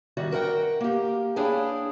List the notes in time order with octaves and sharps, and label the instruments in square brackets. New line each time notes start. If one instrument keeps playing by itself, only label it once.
[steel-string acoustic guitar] D#3 G3 F#4 D5 E5
F#4 A#4 C5 F#5 G5
A#3 G4
D4 E4 G#4 C#5 F5 G5